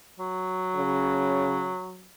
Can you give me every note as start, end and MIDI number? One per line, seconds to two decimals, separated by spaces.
0.20 2.10 54
0.76 1.71 49